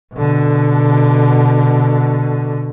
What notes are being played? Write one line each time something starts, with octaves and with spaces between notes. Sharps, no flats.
B2 D3